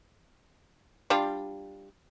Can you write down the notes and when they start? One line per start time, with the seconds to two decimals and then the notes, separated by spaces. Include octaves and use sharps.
1.10 G3 D4 F4